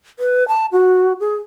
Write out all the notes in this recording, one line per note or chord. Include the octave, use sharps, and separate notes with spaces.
B4
A5
F#4
G#4